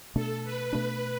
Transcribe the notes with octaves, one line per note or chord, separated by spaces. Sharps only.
B2 A3 D4 A4
B4
B2 A3 D4 B4